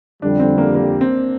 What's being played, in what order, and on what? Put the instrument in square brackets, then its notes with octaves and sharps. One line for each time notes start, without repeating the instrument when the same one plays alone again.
[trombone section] F2 D3 G3 [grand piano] D4
[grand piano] C4
A#3
A#3
C4